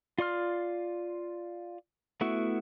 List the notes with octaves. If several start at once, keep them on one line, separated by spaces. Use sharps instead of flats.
F4 D5 C6 F6
A3 B3 E4 F#4